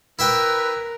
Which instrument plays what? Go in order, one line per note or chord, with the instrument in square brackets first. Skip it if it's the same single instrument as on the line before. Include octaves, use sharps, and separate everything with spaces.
[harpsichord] E4 E5 G5 [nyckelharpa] A#4 [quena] B4